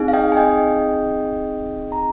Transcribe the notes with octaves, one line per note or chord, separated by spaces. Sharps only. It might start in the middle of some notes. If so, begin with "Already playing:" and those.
Already playing: C4 D#4 G#4
F5
D#5 G5
G#5
D#5 G5
A#5